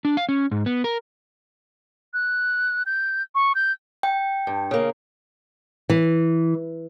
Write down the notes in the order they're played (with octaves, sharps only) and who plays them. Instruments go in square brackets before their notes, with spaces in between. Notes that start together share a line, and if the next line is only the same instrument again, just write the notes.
[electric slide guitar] D4
F5
C#4
G#2
B3
A#4
[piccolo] F#6
G6
C#6
G6
[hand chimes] G5
[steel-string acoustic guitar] G2
C#3 A#3
E3